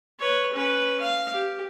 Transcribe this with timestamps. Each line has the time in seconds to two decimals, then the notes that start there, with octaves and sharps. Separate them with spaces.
0.20 B4 C#5
0.53 C#4 B4
1.00 F5
1.33 G4